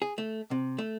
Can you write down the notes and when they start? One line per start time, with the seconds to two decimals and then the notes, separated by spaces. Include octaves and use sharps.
0.02 G#4
0.18 A3
0.51 C3
0.78 A3